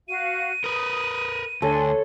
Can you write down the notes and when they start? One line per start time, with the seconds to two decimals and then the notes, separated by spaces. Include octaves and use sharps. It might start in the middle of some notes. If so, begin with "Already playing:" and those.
0.08 F#4 F5 D#7
0.64 A#4 B4 D#6
1.62 D2 D4 A4 C#5 G#5 C6